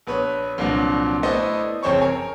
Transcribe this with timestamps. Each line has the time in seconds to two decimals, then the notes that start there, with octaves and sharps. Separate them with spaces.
0.07 A#1 B3 B4 C#5
0.58 C2 A#2 D3 F3 F#3
1.23 A3 B3 E4 C5 D5 D#5
1.83 F#1 F2 C4 C5 C#5 C#6
2.01 A#4 C#5 G#5